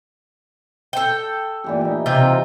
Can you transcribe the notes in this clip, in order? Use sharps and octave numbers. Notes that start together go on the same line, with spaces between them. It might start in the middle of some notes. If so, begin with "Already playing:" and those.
A4 G5
A#2 E3 G4
E3 D#4
C3 F4 G5